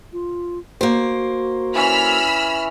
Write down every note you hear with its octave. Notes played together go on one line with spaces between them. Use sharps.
F4
A#3 F#4 C5
E3 C#4 B5 E6 F6